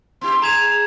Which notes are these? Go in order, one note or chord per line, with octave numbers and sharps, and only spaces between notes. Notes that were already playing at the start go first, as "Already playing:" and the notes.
B3 E4 G4 C6
G#4 A#5 G#6 E7 F7